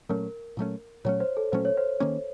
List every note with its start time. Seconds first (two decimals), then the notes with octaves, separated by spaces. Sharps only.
0.09 A#2 F#3 A3 C#4 A#4
0.57 A#2 F#3 A3 C#4
1.05 A#2 F#3 A3 C#4 C#5
1.20 C5
1.37 A4
1.52 A#2 F#3 A3 C#4 C5
1.65 C#5
1.77 C5
2.00 D#3 A#3 C#4